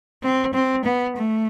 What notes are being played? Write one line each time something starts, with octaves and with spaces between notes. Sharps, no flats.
C4
C4
B3
A3